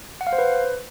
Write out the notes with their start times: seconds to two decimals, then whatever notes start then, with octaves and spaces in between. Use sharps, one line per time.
0.21 F#5
0.27 F5
0.33 C5
0.38 B4